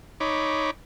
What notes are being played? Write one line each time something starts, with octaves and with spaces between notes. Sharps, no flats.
D#4 C#5 B5 D6